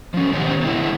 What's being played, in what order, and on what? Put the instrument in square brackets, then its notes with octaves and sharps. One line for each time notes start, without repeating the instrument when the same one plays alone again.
[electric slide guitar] F3 C#4
D#3 G#3 B3 G4 C5 C#5
D3 G#3 E4